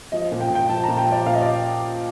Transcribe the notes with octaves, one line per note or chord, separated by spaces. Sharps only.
F3 D#5
A#2
G5
A#2
G5
F3 A5
A#2 A#5
G5
F3 D5
A#2 F5
D#5
D5